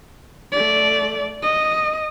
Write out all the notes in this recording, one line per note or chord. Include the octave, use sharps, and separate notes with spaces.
A3 D5
D#5